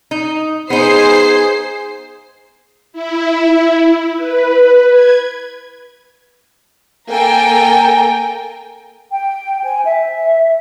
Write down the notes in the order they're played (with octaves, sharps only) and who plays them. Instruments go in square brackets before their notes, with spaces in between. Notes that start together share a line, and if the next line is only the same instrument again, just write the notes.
[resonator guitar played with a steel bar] D#4
[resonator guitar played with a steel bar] B3 D#4 [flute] G#4 [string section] C5 C7
[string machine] E4
B4
G#6
[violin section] A#3 A4 G5 G#5 A#5
[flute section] G5
C5 G#5
E5